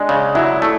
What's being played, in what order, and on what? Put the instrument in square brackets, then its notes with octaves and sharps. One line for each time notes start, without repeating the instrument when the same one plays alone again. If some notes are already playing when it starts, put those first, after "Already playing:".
Already playing: [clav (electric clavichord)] G#3 [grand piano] D4
[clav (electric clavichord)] C#3
[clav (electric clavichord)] F#3 [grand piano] E4
[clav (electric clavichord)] A3